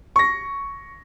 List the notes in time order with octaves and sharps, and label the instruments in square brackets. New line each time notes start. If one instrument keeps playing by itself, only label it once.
[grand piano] C#6 A#6